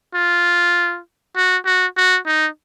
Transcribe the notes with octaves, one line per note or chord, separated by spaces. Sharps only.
F4
F#4
F#4
F#4
D#4